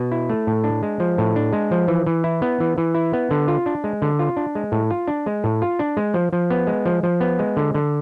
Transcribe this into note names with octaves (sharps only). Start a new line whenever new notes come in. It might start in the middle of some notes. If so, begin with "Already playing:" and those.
Already playing: B2
E4
A3
A2
D4
G#3
F3
A2
D4
G#3
F3
E3
E3
E4
B3
E3
E3
E4
B3
D3
F4
D4
G#3
D3
F4
D4
G#3
A2
F4
D4
G#3
A2
F4
D4
G#3
F3
F3
B3
G#3
F3
F3
B3
G#3
D3
D3